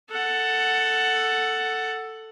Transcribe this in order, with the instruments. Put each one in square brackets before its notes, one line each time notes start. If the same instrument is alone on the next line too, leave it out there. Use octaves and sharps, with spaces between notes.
[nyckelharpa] A4 F#5